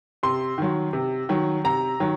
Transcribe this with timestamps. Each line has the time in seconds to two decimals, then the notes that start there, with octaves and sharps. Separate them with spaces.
0.23 C3 C6
0.58 D#3 F#3
0.93 C3
1.29 D#3 F#3
1.64 C3 A#5
2.00 D#3 F#3